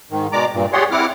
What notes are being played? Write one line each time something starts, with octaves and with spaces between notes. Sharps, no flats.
G#2 D#3
B2 G#3 D5 A#5 D6
G2 A#2
G4 G#4 C#5 D5 F#5 C6
C4 E4 F#5 D6 F6